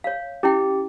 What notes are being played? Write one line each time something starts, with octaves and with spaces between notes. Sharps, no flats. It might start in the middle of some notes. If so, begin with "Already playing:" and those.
C#5 F5
C#4 E4 G4 G5